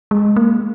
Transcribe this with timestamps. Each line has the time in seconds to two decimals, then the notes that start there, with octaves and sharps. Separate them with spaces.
0.11 G#3
0.36 A#3